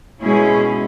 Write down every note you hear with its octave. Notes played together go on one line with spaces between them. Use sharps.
B2 G#3 C#4 E4 G#4